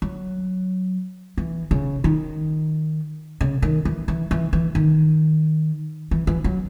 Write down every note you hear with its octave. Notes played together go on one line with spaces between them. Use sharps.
F#3
E3
C#3
D#3
C#3
D#3
E3
E3
E3
E3
D#3
E3
E3
F#3